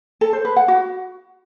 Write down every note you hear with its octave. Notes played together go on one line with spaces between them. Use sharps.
A4
C5
B4
F#5
F#4